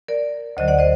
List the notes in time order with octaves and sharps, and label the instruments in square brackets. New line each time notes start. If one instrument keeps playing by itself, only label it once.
[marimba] A#4 D5
D2 D3 F#3 C5 D#5
D5 F#5
C5 D#5